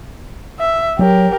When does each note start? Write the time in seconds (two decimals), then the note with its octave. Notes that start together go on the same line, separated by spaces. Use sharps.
0.60 E5
0.99 F#3 G4 A#4